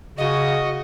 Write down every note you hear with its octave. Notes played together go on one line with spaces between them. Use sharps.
C#3 F#4 D#5